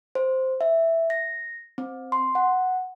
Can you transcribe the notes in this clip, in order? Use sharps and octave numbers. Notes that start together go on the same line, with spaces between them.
C5
E5
A#6
C4
C6
F#5